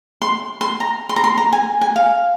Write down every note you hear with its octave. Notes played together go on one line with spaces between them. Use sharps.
C6
C6
A#5
C6
A#5
C6
A#5
G#5
G#5
F5